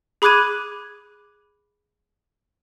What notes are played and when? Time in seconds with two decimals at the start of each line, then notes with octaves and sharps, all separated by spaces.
0.22 G#4 B5 D6 F#6 G#6 D#7